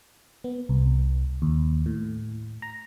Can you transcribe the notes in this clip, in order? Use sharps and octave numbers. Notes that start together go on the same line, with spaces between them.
B3
C2
D#2
A2
A#5